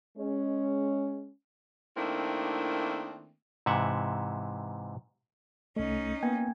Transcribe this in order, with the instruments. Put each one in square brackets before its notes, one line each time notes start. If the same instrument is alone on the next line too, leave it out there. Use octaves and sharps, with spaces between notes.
[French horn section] G#3 C#4
[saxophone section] D#3 A3 A#3 C4 D4 E4
[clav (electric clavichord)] G#2 C3 E3 E5 F#5
[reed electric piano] C2 A3 [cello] C#4 D#4 [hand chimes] D#5
[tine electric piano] A#3 [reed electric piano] B3 [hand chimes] G5 G#5 G#6